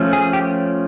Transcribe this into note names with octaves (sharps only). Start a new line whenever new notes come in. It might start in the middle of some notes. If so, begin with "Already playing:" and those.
Already playing: F3 A3 C#4
G#4
G4